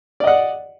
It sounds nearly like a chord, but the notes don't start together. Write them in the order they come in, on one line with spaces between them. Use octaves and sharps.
D5 D#5 F#5